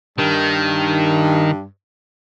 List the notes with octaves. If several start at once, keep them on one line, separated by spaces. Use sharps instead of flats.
G2 D#3